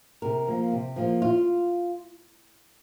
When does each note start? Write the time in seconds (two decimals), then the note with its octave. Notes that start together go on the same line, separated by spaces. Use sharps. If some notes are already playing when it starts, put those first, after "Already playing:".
0.22 C3 A#4
0.47 F3 A#3
0.72 C3
0.96 F3 A#3
1.22 F4